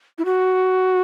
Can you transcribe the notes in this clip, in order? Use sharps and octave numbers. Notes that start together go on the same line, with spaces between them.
E4
F#4